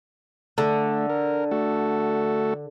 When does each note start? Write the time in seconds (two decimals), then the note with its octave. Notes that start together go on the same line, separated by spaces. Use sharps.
0.58 D3 A3
1.10 A#4
1.51 A3 F#4 A4